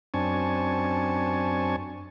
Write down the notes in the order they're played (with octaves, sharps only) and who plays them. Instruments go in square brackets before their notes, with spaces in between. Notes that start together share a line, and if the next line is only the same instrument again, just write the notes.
[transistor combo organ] F#2 C4 D4 G#5 A5 C#6